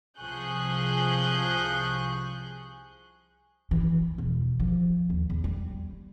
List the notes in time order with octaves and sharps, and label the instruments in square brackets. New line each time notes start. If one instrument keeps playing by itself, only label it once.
[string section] C2 F3 G#4 C#6 F#6 G6
[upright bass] E3
E1
F3
D#2
E2
G3